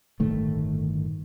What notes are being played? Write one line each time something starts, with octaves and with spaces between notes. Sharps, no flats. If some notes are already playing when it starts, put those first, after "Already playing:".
G1 A2 D#3 A3